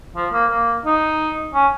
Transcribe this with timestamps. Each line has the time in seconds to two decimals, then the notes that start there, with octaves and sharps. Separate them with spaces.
0.16 F3
0.33 A#3
0.51 A#3
0.85 D#4
1.54 C#4